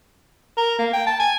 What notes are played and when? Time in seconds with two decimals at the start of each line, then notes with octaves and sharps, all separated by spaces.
0.57 A#4
0.79 A#3
0.93 G5
1.07 A5
1.20 G#5